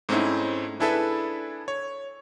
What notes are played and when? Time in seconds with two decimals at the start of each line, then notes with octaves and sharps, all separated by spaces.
0.09 G#2 A3 C4 C#4 D#4 E4
0.80 D4 E4 G#4 A4 B4 E5
1.68 C#5